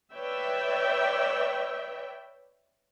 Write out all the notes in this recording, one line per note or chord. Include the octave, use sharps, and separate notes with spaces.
B4 C#5 D5 E5 G5